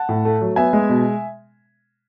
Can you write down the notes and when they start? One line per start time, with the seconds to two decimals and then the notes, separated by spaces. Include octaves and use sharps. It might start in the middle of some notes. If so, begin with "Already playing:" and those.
Already playing: F#5 A5
0.09 A2
0.25 A3
0.41 F#3
0.56 B3 E5 G#5
0.73 G#3
0.89 B2